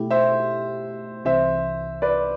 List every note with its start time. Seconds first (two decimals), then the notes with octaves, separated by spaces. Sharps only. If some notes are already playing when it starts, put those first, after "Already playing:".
Already playing: B2 A3 E4 G4
0.10 C5 E5
1.25 C2 C3 E3 C5 E5
2.02 B4 D5